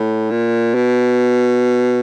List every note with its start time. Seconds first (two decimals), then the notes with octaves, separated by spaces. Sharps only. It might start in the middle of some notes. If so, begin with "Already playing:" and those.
Already playing: A2
0.30 A#2
0.74 B2